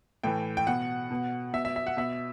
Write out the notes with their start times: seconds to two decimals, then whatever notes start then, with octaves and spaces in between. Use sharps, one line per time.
0.23 A2 E3 G5
0.57 G5
0.67 B2 F#5
1.11 B2
1.53 B2 E5
1.65 E5
1.76 E5
1.87 F#5
1.97 B2 E5